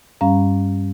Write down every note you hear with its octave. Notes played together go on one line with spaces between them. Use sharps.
G2 G3 C#4 F5 A#5